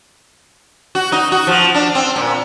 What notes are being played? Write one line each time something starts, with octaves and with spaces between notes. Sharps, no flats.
F#4
D#4
F#4
F3
D4
C4
A#2